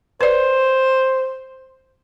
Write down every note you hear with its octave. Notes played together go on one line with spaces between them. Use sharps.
B4 C5 D5